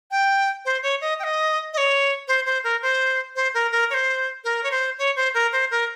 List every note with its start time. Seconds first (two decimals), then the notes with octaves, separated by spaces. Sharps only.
0.11 G5
0.65 C5
0.83 C#5
1.01 D#5
1.20 G5
1.24 D#5
1.73 D#5
1.78 C#5
2.28 C5
2.46 C5
2.64 A#4
2.82 C5
3.36 C5
3.54 A#4
3.72 A#4
3.90 C#5
3.94 C5
4.44 A#4
4.63 C#5
4.71 C5
4.98 C#5
5.16 C5
5.34 A#4
5.53 C5
5.71 A#4